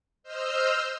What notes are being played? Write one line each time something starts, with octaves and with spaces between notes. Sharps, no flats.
C5 D#5 E6 F6 G6